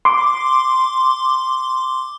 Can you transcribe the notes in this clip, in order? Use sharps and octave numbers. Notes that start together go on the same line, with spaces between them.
C6 D6